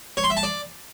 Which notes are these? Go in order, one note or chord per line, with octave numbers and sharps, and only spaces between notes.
C#5
C6
E5
A5
D5